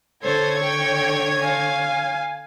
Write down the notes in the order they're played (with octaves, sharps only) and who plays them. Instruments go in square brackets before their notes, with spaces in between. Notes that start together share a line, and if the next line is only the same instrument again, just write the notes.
[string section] D3 C#5 G#6 [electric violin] A4 C5
[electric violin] G5 C#6
F5 G#5